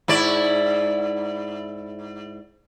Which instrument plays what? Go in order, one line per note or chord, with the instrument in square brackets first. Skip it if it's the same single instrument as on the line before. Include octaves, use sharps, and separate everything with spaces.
[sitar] G#2 E4 D5